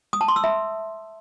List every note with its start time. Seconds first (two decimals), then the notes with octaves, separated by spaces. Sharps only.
0.13 D#6
0.21 A5
0.28 C6
0.36 E6
0.44 E5